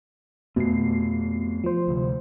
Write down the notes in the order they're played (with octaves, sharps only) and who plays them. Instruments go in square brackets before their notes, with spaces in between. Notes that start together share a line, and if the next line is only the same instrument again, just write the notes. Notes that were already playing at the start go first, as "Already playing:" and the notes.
[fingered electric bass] F2 A3 [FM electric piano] B2 C7
[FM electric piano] F3 C5
[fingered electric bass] D2 C3